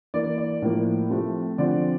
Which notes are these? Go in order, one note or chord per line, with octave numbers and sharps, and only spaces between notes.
E3 A#3 D5
D5
A2 F3 A#3
C3 F3 A3 C4
D3 F3 C4 D5